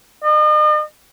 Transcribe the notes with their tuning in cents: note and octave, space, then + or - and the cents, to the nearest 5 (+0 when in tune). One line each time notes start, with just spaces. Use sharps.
D#5 -40